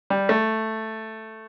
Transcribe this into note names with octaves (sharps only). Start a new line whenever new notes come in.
G3
A3